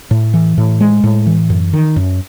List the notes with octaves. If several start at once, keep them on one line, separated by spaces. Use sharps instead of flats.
A2
E3
A2
G#3
A2
E3
F#2
D#3
F#2